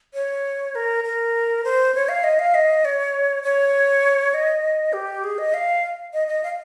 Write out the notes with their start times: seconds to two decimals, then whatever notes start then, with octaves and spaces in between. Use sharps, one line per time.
0.14 C#5
0.75 A#4
1.04 A#4
1.64 C5
1.94 C#5
2.09 F5
2.24 D#5
2.39 F5
2.54 D#5
2.85 C#5
3.43 C#5
4.34 D#5
4.93 G4
5.24 G#4
5.38 D#5
5.54 F5
6.13 D#5
6.28 D#5
6.43 F5